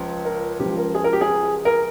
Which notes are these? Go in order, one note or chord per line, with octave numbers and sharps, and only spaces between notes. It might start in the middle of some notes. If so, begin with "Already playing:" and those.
Already playing: C#2 C#3 F3
A#4
C#2 C#3 F3 G4
A#4
G#4
A#4
G4
G#4
A#4